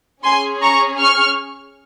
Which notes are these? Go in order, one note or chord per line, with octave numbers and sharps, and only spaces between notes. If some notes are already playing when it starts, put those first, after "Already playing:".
C#4 G#4 G#5 C6
A#5 C#6
C#6 F6